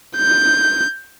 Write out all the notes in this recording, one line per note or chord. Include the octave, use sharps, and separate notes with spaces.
G6